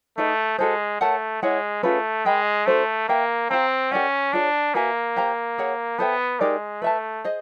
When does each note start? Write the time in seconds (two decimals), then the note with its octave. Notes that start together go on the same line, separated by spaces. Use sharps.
0.18 A3 D#4 G#4 B4 D#5
0.59 G#3 F#4 A4 C5
1.01 A3 A#4 C#5 F#5 A5
1.42 G#3 E4 G#4 C#5 F#5
1.83 A3 C#4 F4 G#4 B4
2.25 G#3 A#4 D#5 G5 B5
2.66 A3 D4 F#4 A4 C5
3.08 A#3 B4 E5 G5
3.50 C4 G4 C5 F5 A#5
3.91 C#4 G4 A#4 D5 F#5
4.33 D4 F4 G#4 C#5
4.75 A#3 F#4 B4 E5 G#5
5.16 G4 C5 F5 A#5
5.58 G#4 C#5 F#5
5.99 B3 A4 C5 E5 G5
6.40 G#3 D#4 G4 A#4 D5
6.82 A3 B4 E5 A5
7.24 G#4 C5 D#5